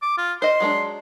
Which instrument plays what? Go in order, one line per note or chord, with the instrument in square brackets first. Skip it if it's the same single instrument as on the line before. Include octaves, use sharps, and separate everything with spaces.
[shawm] D6
F4
[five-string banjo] C5 D#5 [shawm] C6
[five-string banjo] F#3 G#3 D4